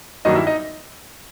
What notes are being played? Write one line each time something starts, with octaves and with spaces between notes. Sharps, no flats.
G2 D#3 F#3 A#3 D4 D#4 D#5
E4 E5
D#4 D#5